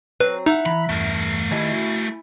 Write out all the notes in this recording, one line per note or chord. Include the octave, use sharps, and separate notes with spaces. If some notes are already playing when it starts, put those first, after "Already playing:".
F#3 C4 B4
D#4 E4 E5 F#5
E3 A#5 B5
E2 G2 A3 A#4 A5
D#3 E4 G4 D#5 G#5
F#4